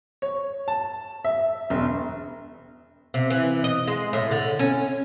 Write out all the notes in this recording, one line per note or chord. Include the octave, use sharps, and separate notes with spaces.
C#5
A5
E5
E1
C3
E3
D#5
G#3
A2
D3
C#4